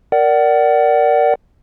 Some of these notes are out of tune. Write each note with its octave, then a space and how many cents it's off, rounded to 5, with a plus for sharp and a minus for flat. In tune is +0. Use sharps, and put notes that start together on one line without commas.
A#4 +0 D5 +0 F#5 +30